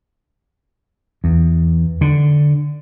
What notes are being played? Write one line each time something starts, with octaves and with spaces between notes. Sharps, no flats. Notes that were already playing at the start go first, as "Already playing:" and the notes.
E2
D3